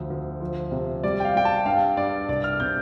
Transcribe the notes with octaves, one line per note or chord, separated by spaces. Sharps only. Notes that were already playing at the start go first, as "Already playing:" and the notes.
Already playing: D2 F3
D2
F3
C3
G3 D5
G5
F5
G3 G5
A5
G2 F5
G2 D5
C2 D5
F6
C3 G6